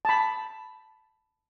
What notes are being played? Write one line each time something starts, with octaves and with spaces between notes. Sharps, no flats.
A5 B5